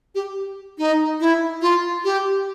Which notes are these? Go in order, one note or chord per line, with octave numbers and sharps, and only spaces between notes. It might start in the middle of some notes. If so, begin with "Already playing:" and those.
G4
D#4
E4
F4
G4